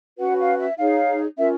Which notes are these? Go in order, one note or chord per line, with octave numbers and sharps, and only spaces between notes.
C#4 F#4 B4 F#5
F5
E5
D#4 G#4 C#5 F5
C#4 F4 A#4 E5